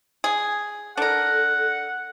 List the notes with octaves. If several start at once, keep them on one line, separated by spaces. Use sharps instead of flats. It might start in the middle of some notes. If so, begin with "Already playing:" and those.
G#4
D4 A4 A#4 F#5